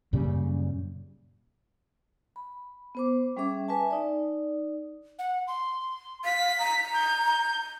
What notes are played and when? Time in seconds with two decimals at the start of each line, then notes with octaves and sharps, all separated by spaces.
0.13 F#2 A#2 C#3 G3
2.36 B5
2.95 B3 C5 D6
3.37 G3 C#4 G#4 E5 D6
3.68 B4 E5 G#5 A5
3.91 D#4 D5
5.19 F#5
5.47 C6
6.25 F5 B6
6.59 A#5
6.94 G6